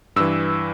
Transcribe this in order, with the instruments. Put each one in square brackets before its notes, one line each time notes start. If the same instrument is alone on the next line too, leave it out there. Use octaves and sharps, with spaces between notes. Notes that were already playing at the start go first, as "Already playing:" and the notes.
[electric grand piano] G2 E3 E6